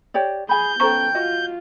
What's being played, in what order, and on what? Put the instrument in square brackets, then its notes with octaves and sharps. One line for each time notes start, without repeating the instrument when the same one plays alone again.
[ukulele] G4 C#5 D5
[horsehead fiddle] G#4 [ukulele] G#5 B5 [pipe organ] G6
[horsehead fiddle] B3 G5 [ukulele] C#4 A4 [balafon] C5 A#5 C#6
[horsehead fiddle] F4 [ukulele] F#4 D#5